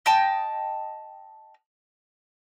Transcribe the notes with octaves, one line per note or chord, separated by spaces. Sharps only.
D#5 G5 A5